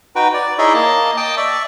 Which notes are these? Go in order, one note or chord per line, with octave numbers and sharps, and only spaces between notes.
D#4 F#4 B4 G5
D5
D#4 E4 G#4 C#5 D#5 E5
A#3 D#5 A5
D#5 G5 A5 D#6
D5 E5 C#6